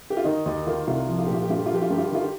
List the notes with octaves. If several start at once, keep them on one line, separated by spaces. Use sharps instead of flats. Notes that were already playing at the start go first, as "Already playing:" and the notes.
G4
F4
D#3 D#4
D#2 D#4
D#3 F4
C2 F4
F3
F4
A#2 G4
F4
G4
G2 F4
G4
F4
F3 G4
F4
G2 G4
F4
G4
D#3 F4
G4